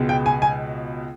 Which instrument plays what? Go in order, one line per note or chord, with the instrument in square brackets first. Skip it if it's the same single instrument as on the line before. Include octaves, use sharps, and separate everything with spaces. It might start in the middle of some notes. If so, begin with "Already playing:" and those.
Already playing: [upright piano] C#2 B2 G#3 B3
G5
G#5
G#5